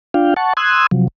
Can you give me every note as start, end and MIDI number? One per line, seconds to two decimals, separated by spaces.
0.14 0.34 62
0.14 0.34 65
0.14 0.34 77
0.14 0.34 79
0.36 0.53 78
0.36 0.53 81
0.36 0.53 85
0.57 0.87 84
0.57 0.87 87
0.57 0.87 88
0.57 0.87 90
0.57 0.87 92
0.91 1.08 48
0.91 1.08 53
0.91 1.08 54